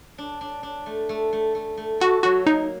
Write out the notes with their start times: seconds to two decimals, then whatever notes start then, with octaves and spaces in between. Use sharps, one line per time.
0.18 D4
0.41 D4
0.63 D4
0.86 A3
1.09 A3
1.33 A3
1.55 A3
1.77 A3
2.00 F#4 A4
2.23 F#3 F#4
2.47 A#3 D#4